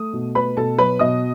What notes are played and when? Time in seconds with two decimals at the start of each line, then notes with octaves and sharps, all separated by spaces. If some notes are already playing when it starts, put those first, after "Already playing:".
Already playing: A3 D#6
0.13 B2
0.35 A3 B4 B5
0.57 B2 A4 A5
0.78 F#3 B4 B5
0.99 B2 D#5 D#6